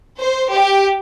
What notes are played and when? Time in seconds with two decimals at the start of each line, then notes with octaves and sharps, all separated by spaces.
0.18 C5
0.51 G4